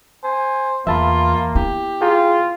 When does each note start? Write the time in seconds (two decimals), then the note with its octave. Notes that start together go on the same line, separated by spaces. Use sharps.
0.24 C5 G#5
0.87 E2 A#3 F4 E5 A5 B5
1.55 B3 E4 G4
2.01 F4 G#4 G5 A#5